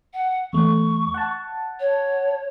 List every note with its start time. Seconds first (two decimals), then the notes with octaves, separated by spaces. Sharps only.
0.14 F#5
0.53 E2 A3 C#6
1.14 F#5 A5
1.80 C#5